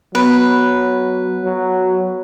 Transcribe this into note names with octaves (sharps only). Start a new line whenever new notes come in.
F#3 B3 B4
F#3